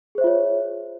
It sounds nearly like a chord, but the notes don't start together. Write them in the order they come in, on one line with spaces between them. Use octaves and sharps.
G#4 C5 E5 F4 C#5